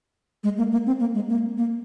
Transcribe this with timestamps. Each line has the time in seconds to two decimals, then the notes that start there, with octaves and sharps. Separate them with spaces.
0.44 G#3
0.58 A#3
0.72 A#3
0.86 C4
1.00 A#3
1.15 G#3
1.29 A#3
1.58 A#3